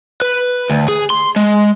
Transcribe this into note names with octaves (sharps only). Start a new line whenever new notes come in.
B4
D2
G#4
C6
G#3